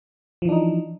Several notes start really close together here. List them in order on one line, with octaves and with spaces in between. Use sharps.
F3 E3 D4 D#4